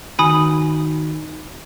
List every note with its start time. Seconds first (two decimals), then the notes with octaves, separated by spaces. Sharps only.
0.19 D#3 D#4 F#4 G#5 B5 D#6